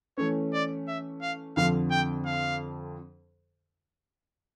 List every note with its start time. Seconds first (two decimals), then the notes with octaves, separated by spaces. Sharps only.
0.18 E3 A3 C#4 C#5
0.53 D5
0.88 E5
1.22 F5
1.57 F2 D3 F3 F5
1.91 G5
2.26 F5